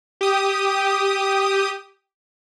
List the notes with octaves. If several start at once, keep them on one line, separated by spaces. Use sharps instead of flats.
G4 D#6